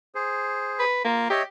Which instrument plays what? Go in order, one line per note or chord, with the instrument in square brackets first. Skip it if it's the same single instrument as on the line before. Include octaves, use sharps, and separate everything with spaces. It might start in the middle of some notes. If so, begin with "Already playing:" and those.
[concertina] G#4 C5
[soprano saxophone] B4
[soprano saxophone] A#3 [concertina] F4
[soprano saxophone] G4 [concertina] C#5 D#5 E5